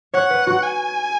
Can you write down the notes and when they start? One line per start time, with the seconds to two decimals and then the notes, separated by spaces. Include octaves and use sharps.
0.14 C#5 F#5
0.30 B4
0.47 F#4
0.63 G#5